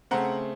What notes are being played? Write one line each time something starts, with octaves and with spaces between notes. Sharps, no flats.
C#3 A3 C4 F#5 A#5